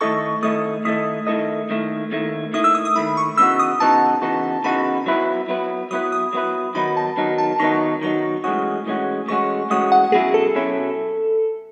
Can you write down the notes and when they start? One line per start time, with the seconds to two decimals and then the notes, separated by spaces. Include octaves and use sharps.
0.01 D#3 A3 E4 A4 D#5 C#6
0.43 D#3 A3 E4 A4 D#5 D#6
0.85 D#3 A3 E4 A4 D#5 D#6
1.27 D#3 A3 E4 A4 D#5
1.70 D#2 D#3 A3 E4
2.12 D#2 D#3 A3 E4
2.53 D#2 D#3 A3 E4 D#6
2.64 E6
2.75 D#6
2.85 D#6
2.96 D#2 D#3 A3 E4 B5
3.17 C#6
3.37 C#3 E3 B3 D#4 F#4 E6
3.59 D#6
3.80 C#3 E3 B3 D#4 F#4 A5
4.22 C#3 E3 B3 D#4 F#4
4.64 C#3 E3 B3 D#4 F#4 B5
5.06 F#3 B3 E4 B4
5.48 F#3 B3 E4 B4
5.91 F#3 B3 E4 B4 D#6
6.12 D#6
6.33 F#3 B3 E4 B4
6.75 D#3 F#3 B3 D#4 B5
6.97 A5
7.17 D#3 F#3 B3 D#4
7.38 A5
7.60 D#3 F#3 B3 D#4 C#6
8.02 D#3 F#3 B3 D#4 C#6
8.44 A2 E3 G#3 C#4 F#4 D#6
8.86 A2 E3 G#3 C#4 F#4
9.28 A2 E3 G#3 C#4 F#4 C#6
9.70 A2 E3 G#3 C#4 F#4 D#6
9.92 F#5
10.12 B2 F#3 C#4 E4 G#4
10.34 A4
10.55 B2 F#3 C#4 E4